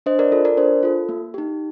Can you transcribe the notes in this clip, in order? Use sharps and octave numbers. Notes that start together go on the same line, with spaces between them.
D4 C5 D#5
A#4 D5
F4 A4
A#4 D5
D4 C5
F4 A4
A#3
D#4 G4